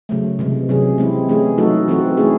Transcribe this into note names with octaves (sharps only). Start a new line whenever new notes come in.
C#3 F#3 A3
C3 E3 G#3
C3 F#3 C#4 G#4
G#3 C4 E4
E3 A3 C#4 G#4
F#3 A3 D#4 F#4 A4
E3 C4 F#4 A4
A3 C#4 E4 G#4